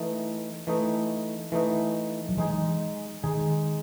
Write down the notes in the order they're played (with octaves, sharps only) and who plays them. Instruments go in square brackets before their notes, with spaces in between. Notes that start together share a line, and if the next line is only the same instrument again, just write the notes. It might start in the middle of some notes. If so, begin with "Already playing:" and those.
Already playing: [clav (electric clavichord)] E3 A3 D#4
E3 A3 D#4
E3 A3 D#4
[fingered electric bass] F#3
[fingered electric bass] E3 [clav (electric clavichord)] G#3 D#4 G#4
[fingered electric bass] D#3 [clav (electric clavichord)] G#3 D#4 G#4